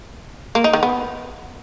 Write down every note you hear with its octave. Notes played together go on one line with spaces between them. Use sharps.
A#3
D#4
D#3
B3